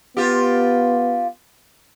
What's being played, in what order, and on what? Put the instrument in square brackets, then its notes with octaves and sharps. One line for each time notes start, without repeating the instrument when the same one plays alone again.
[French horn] B3 [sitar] F4 G4